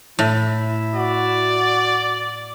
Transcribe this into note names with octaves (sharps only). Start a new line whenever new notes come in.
A2 E4
F#4 D5